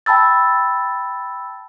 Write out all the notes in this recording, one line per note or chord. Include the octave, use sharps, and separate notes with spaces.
G5 A5 B5 E6 A6